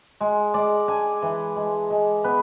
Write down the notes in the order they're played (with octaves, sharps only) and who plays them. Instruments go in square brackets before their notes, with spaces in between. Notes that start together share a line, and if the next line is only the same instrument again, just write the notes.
[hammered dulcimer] G#3
G#3 D5
D4 G#5
E3
G#3
G#3
B3 B4